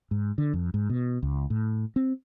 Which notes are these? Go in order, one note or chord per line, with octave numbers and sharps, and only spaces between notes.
G#2
D3
F2
G#2
B2
C#2
A2
C4